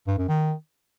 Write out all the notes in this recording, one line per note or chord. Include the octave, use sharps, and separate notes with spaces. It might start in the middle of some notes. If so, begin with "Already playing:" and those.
G2
F#2
D#3